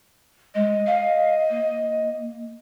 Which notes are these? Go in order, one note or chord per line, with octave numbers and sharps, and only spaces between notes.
G#3 D#5
F5
A#3